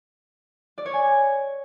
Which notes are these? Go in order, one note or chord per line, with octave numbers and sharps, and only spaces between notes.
D5
C#5
G#5